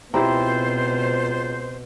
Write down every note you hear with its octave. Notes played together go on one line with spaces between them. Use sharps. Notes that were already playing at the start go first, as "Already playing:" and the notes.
C#2 B2 C4 E4 F4 G4 C5 A#5